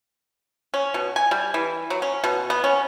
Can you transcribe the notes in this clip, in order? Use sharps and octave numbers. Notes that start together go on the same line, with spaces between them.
C#4
B2
G#5
G3
E3
F#3
C#4
B2
B3
C#4